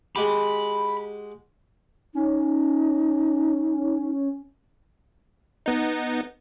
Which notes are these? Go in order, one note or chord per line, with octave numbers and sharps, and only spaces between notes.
G#3 F#4 G4 B5
C#4 D#4
B3 D#4